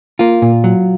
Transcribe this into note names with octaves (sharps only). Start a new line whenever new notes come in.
A#3 F4
A#2
F#3